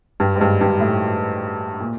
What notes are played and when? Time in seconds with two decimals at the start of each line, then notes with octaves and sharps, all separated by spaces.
0.20 G2
0.36 G#2
0.41 G2
0.61 G2
0.80 A2
1.80 A#2